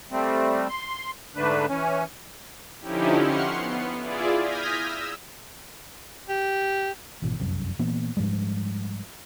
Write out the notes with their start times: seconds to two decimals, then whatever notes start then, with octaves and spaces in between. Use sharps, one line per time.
0.11 G3 A3 C4
0.69 C6
1.36 G#2 D3 A3 D4 B4
1.68 E3 C#4
2.80 D3 F3 C#4 D#4 E4 G4
3.21 F#5 C6 C#6 F6 C7 C#7
3.53 B3
4.01 E4 F4 G#4 D5
4.41 D#6 F6 G6 G#6 A#6 B6
4.83 E6
6.29 G4
7.22 G#1 B2 E3
7.39 F1 C2 F#2
7.79 A#2 E3 A#3 B3
8.17 G#2 F3 G3 G#3